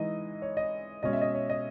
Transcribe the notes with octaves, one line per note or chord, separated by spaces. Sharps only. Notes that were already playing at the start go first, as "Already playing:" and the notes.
Already playing: E3 G#3 D#4 D#5
C#5
D#5
B2 G#3 C#4 D#5
E5
D#5
C#5
D#5